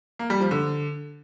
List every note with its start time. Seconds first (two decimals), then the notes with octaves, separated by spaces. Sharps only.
0.19 A#3
0.30 G3
0.41 F3
0.51 D3